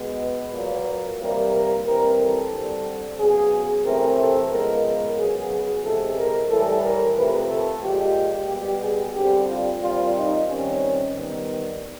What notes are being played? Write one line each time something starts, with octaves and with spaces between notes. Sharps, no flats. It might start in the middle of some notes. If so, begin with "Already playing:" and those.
Already playing: B2 G#3 B3
B4
A#2 F#3 A#3
C3 E3 G3 A#3 A#4
A#4
E3 G3 C4 A#4
A4
D3 G3 C4
C#3 F#3 B3 G#4
C3 E3 A3 C4 A#4
A4
C#3 F3 G#3 B3 A#4
A#4
C#3 F#3 B3 G#4
G#4
C3 E3 G#3 A4
A#4
A2 E3 G3 A4
A#4
C3 F3 A3 B4
A4
A#2 F3 G#3 G4
B2 G3 B3 G4
G#4
D3 G3 C4 G4
F4
A#2 G3 C4 F4
D#4
D#3 G3 C4 C#4
D#3 G3 B3